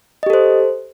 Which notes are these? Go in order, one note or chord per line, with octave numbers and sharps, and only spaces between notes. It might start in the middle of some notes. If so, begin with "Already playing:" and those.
G4 A4 C5 D#5